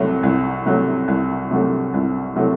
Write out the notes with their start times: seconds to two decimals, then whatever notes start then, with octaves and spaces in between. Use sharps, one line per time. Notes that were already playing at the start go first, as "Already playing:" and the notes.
Already playing: C2 C3 F#3 A3
0.23 C2
0.66 C3 F#3 A3
1.08 C2
1.51 C3 F#3 A3
1.94 C2
2.36 C3 F#3 A3